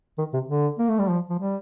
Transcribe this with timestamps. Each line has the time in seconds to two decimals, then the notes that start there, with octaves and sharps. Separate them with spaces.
0.18 D#3
0.34 C3
0.49 D3
0.79 A#3
0.89 A3
0.99 G3
1.10 F3
1.30 F3
1.39 G3